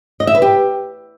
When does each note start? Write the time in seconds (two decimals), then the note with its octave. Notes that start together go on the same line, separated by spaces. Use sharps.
0.20 D#5
0.27 E5
0.35 B4
0.42 G4